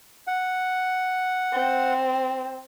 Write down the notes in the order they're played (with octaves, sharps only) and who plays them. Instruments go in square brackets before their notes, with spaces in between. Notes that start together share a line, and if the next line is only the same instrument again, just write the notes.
[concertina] F#5
[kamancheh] C4